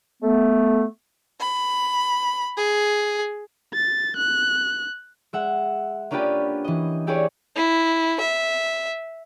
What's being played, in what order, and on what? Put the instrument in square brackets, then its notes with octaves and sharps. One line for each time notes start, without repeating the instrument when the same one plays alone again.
[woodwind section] A3 B3
[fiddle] B5
G#4
[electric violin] A6
F#6
[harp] G#3 E5 F#5
A#3 C#4 D4 F4 G4 B4
E3 D#5
E4 G4 G#4 B4 C#5 D5
[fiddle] E4
E5